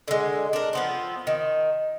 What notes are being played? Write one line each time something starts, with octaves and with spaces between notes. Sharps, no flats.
D3 G#3
D4 A#4
F3 B3 C4
D#3